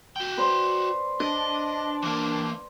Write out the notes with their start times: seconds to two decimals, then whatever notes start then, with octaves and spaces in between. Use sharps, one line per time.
0.16 F#4 G5
0.37 B4 C5 D5
1.20 D4 D#5
2.02 E3 A#3